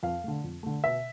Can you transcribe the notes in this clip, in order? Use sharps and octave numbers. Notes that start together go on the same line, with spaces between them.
F2 F5
D3 A3
F2
D3 A3
B2 E5